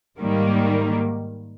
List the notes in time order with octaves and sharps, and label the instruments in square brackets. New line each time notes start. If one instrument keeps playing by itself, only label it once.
[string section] G#2 D#3 G3 A#3